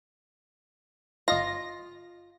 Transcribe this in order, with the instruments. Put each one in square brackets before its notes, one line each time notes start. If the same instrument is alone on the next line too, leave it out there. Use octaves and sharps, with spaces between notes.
[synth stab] G1 D#5 A#6 [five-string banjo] F4